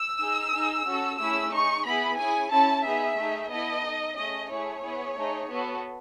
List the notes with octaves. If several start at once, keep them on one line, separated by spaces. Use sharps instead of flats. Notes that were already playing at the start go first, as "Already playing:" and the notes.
Already playing: E6
D#4 G#4
D#4 G#4
C#4 F#4 A4
A3 C#4 E4 G#4 E6
D#4 G#4 C#6
B3 E4 G#4 B5
C#4 E4 G#4 G#5
C#4 E4 A4 A5
B3 D#4 G#4 E5
A3 D#4 G#4
B3 E4 A4 D#5
D#4 A4
A3 C#4 G#4 D#5
A3 E4 G#4 C#5
B3 E4 G#4
A3 D#4 G#4
B3 F#4 A4